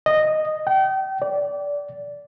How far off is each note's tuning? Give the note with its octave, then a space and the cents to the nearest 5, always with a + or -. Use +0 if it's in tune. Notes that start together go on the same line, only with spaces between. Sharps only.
D#5 -10
G5 -35
D5 -20